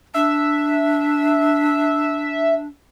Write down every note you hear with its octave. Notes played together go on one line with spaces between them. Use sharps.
D4 E5